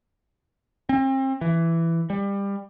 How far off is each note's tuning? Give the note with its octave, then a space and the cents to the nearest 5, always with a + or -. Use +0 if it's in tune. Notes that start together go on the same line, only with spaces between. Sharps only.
C4 +35
E3 +10
G3 +25